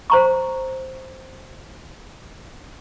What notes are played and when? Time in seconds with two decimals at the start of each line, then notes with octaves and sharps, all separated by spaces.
0.10 C5 A#5 C#6